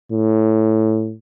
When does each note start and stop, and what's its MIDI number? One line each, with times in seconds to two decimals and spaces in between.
0.12 1.14 45